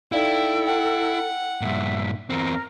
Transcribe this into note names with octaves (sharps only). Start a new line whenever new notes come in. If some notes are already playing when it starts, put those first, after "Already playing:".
D#4 E4 A4 D5 F5 G5
F#5 G5
G2 A#2 E5
E2 C4 A#4